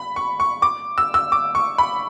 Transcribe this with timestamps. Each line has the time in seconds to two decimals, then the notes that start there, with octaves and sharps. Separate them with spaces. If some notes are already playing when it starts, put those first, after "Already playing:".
Already playing: B5
0.16 C#6
0.40 C#6
0.62 D6
0.98 E6
1.14 E6
1.32 D6
1.55 C#6
1.78 B5